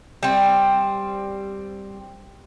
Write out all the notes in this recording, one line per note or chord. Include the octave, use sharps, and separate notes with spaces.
G3 C4